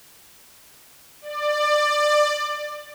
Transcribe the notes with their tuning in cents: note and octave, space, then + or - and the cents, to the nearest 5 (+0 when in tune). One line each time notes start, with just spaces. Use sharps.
D5 +20